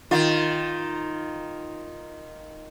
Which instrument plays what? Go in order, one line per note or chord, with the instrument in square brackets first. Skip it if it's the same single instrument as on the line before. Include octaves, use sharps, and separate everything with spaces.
[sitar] D#3 F4